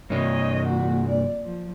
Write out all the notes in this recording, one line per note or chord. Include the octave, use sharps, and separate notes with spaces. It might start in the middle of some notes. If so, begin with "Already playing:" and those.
G2 C3 C#5 D#5
A#2 F#4
D5
F3